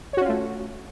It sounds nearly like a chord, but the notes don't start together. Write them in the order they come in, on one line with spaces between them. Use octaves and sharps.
C#5 F#4 C#4 F4 A3